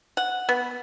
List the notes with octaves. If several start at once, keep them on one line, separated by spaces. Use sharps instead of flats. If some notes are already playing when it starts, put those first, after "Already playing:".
F#5
B3